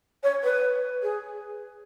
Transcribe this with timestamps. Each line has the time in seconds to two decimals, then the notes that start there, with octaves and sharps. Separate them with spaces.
0.23 C#5
0.44 B4
1.03 G#4